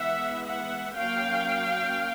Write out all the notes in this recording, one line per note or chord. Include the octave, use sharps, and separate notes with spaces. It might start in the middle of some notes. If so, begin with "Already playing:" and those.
Already playing: E3 G#3 B3 E5 F#5
E5 F#5
F#3 A#3 C#4 F5 G5